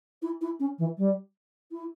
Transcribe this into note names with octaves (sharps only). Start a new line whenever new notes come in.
E4
E4
C#4
E3
G3
E4